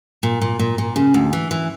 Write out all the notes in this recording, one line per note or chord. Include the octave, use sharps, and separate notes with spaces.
A#2
A#2
A#2
A#2
C#3
D2
E3
E3